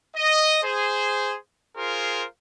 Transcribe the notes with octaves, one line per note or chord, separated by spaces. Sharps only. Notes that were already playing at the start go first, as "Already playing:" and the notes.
D#5
G#4 C5
F4 G#4 A#4 C5